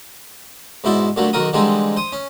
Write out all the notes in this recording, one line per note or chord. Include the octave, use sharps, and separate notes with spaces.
G#2 B2 E4 C5 D5
A#2 D3 F#3 A3
B1 D#3 F#4 A#4 D#6
D3 E3 G3 G#3 C4 D#4
C5 D#6
C#4